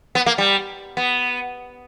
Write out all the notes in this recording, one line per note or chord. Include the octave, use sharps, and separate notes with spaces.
B3
A#3
G3
B3